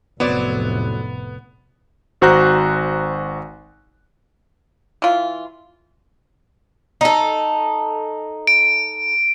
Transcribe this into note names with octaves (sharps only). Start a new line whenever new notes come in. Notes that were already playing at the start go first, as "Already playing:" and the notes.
F1 A2 F#3 B3 C4 D5
G#1 F#4 C5 A#5 F#6
E3 F4
D#4 A4
D7